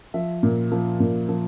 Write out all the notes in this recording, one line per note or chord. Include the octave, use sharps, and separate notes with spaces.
F3 E5
A#2
F3
A#2
F3